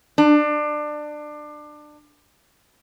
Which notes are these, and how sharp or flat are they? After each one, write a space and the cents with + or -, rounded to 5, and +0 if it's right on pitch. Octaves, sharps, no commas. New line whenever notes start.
D4 +25